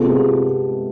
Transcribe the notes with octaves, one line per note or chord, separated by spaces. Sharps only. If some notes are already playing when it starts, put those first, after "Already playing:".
Already playing: C3 G#3 B3 F4 A4